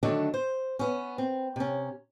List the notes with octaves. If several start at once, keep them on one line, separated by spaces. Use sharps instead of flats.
D3 D#3 F#3 A3 D4 A4
C5
B3 C#4
C4
C3 C#4